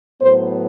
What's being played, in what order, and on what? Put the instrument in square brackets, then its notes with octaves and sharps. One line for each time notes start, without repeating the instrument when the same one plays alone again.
[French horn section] A2 F#3 B3 C5